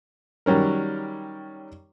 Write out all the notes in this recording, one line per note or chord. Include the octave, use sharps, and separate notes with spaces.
D#3 F#3 G3 C#4 A#4